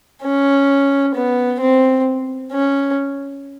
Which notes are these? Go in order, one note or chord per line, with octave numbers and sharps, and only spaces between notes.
C#4
B3
C4
C#4